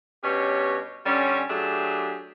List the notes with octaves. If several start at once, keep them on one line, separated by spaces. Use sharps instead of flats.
G2 B2 C#4 G4 C#5
D3 G3 C#4
F#3 A3 D4 G4 G#4